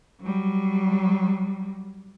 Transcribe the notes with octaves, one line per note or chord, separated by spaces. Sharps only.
F#3 G3